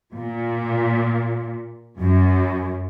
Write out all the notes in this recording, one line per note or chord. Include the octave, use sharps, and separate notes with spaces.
A#2
F#2